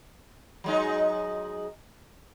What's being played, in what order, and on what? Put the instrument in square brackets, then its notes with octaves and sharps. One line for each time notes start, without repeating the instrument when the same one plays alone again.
[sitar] F#3 G#3 D#4